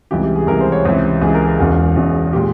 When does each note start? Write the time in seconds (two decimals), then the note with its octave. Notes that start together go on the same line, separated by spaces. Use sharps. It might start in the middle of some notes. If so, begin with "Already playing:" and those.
0.11 C#2 C3 E3 G3 G4
0.23 G4
0.36 G#4
0.47 C#2 C3 E3 G3 A#4
0.61 C5
0.72 C#5
0.85 C#2 C3 E3 C5
1.22 C#2 C3 E3 G#4
1.35 A#4
1.47 A#4
1.59 E1 E2 C#3 E3
1.96 E1 E2 C#3 E3
2.33 A#2 G#3 G4